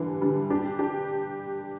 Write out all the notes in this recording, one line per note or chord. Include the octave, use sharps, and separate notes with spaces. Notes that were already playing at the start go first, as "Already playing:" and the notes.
Already playing: D3 E3 G3
D3 G3
D4 G4
D4 G4